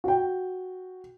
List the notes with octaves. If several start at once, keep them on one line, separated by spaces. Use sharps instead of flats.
F#4 G5